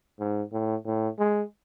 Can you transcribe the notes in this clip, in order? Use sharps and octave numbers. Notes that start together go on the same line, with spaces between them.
G#2
A2
A2
G#3